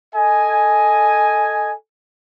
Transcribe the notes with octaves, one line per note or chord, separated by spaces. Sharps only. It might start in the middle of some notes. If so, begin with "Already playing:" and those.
A4 D#5 G#5